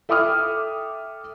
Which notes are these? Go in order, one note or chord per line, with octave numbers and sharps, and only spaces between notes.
A4 E5 G5 D6 D#6 F6